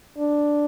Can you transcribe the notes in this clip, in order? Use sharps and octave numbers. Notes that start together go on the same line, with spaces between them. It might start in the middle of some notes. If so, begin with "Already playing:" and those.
D4